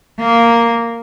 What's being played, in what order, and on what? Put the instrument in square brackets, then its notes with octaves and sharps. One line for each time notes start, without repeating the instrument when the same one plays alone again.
[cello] A#3